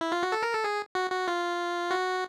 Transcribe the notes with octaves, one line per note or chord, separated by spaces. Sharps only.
E4
F4
F#4
A4
A#4
A4
G#4
F#4
F#4
F4
F#4